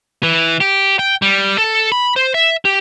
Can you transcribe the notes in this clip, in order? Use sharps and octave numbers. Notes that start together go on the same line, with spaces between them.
E3
G4
G5
G3
A4
B5
C5
E5
G4